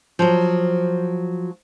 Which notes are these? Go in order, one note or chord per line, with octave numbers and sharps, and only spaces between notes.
F3 F#3